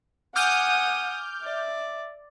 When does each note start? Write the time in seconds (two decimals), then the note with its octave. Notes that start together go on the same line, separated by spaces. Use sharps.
0.36 F#5 G#5 D6 D#6 F6 G6
1.43 D5 E5